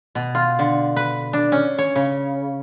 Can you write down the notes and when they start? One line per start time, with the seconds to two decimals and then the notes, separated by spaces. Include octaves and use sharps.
0.15 B2
0.35 F4
0.59 D3
0.96 B4
1.33 D4
1.52 C#4
1.78 C#5
1.96 C#3